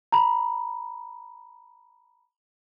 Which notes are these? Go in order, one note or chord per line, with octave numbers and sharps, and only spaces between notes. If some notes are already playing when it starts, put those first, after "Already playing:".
A#5 B5